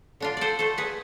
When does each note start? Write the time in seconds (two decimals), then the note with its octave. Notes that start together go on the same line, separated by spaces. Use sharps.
0.20 D3 D4 F4
0.37 A4 C5 D5
0.59 A3 A4 C5
0.78 G#4 B4